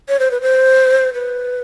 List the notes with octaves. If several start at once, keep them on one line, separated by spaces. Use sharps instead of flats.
C#5
C5
B4
C5
B4